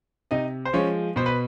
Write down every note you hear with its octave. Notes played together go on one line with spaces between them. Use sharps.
C3 D#4 D#5
C5
F3 G#3 C#4 C#5
B2 C5
B4